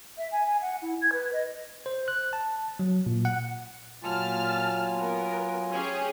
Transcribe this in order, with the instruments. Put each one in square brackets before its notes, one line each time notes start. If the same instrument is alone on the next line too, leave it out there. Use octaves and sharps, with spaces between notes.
[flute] E5
G#5
G#5
F#5
E4
G#6
B4
D#5
[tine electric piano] C5
F#6
A5
F#3
A#2
F#5
[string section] A#2 A5 F6 [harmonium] F#3 F4 G#5
[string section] B3 A#4
C#4 G4 G#4